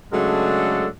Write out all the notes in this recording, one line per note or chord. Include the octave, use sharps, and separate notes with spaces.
C#3 F#3 G#3 A3 D4 A4